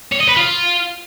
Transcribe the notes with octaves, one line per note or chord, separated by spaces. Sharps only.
C#5
D#5
B4
F4